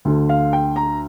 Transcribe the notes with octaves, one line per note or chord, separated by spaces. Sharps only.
D2 D3
F5
G5
A#5